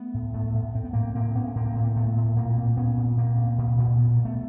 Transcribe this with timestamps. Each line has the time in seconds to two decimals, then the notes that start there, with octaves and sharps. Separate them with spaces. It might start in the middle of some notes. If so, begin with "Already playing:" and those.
Already playing: A3 B3
0.14 A2
0.34 A2 A3 B3
0.54 A2
0.75 A2 C4
0.84 B3
0.93 A2 A#3 C4
1.15 A2 A#3 C4
1.35 A2 B3 C#4
1.56 A2 A#3 C4
1.75 A2
1.96 A2 A3 B3
2.16 A2
2.36 A#2 A#3 C4
2.57 A#2
2.77 A#2 B3 C#4
2.97 A#2
3.17 A#2 A#3 C4
3.38 A#2
3.58 A#2
3.78 A#2
3.98 B2 B3
4.11 A#3
4.19 B2
4.25 A3 B3